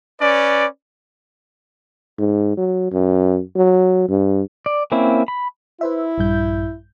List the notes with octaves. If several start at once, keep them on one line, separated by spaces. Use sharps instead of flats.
C#4 B4 D5
G#2
F#3
F#2
F#3
G2
D5
A#3 C4 C#4 E4
B5
E4 B4 C5 E5
A#1 G2 G6